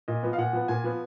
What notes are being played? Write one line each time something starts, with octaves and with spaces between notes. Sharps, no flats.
A#2 D#5
F3 B3
F5
A#2 F#5
F3 B3
A#2 G#5
F3 B3